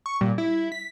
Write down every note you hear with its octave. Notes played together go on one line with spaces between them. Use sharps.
C#6
A#2 G3
E4
B6